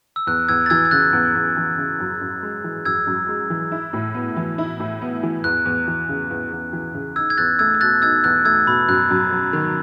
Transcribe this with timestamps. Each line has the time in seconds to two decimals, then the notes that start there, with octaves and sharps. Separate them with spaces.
0.16 E6
0.27 E2 F#6
0.49 E2 E6 G#6
0.66 A6
0.70 E3 E6 G#6
0.85 G#6
0.91 C#3 F#6 A6
1.13 E2
1.35 E2
1.57 E3
1.78 C#3
2.00 F#2
2.21 F#2
2.43 G#3
2.64 E3
2.85 F#2 E6 G#6
3.07 F#2
3.29 G#3
3.50 E3
3.72 E4
3.93 A2
4.14 B3
4.37 E3
4.58 E4
4.80 A2
5.02 B3
5.23 E3
5.44 E2 F#6
5.65 E2
5.87 E3
6.09 C#3
6.31 E2
6.52 E2
6.73 E3
6.95 C#3
7.16 D#4 E6 G#6
7.30 G#6
7.38 E2 F#6 A6
7.59 A3 E6 G#6
7.74 G#6
7.81 B2 F#6 A6
8.02 D#4 E6 G#6
8.24 E2 F#6 A6
8.45 A3 E6 G#6
8.67 B2 B5
8.88 F#2 F#6
9.10 F#2
9.32 F#3
9.53 D#3